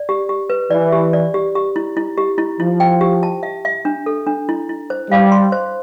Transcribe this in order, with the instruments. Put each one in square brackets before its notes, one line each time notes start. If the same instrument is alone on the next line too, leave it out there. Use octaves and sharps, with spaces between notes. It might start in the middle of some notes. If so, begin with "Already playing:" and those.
Already playing: [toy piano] D5
G4
G4
B4
[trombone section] E3 [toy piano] D5
[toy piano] G4
D5
G4
G4
E4
E4
G4
E4
[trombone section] F3 [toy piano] E4
[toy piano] G5
G4
A5
E5
E5
D4
A4
D4
E4
E4
C5
[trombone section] G3 [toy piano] F5
[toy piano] C6
C5